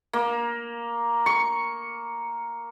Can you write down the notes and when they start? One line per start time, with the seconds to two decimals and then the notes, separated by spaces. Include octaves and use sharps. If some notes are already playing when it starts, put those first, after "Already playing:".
0.13 A#3
1.26 C#6